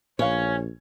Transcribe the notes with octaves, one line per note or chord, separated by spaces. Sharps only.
A#1 C#4 F4 B4 C#5 F5